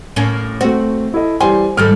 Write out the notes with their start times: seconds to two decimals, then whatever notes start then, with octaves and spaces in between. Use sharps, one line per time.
0.16 A2 A#3 C#4
0.61 A3 C4 F#4
1.14 E4 A4 D#5
1.40 E3 G3 C5 G#5
1.77 G#2 D#3 G3 A4 F6